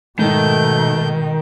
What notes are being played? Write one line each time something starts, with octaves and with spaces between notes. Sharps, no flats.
G#2 B2 D#3 A3 D#4 G6